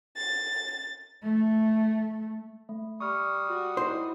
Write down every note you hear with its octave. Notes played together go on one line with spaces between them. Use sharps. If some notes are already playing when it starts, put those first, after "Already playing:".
A6
A3
A3
G3 C#6 D#6 F6 C#7
F#4
D#4 E4 C5 D#5